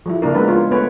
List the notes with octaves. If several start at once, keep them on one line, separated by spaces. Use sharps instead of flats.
F3 G3 E4
C#3 A#3 D4 A#4
G#3 A#3 B3 A#4 B4
G#3 F4 C#5
A3 B3 B4 C#5